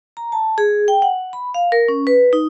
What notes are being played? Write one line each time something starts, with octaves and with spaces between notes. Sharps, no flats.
A#5
A5
G#4
G5
F#5
B5
F5
A#4
C#4
B4
D#4